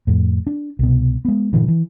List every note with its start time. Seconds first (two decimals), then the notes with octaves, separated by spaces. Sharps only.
0.07 F2 A2
0.47 D4
0.79 C2 B2
1.25 G#3 B3
1.53 G2 A#2 D3 E3
1.68 E3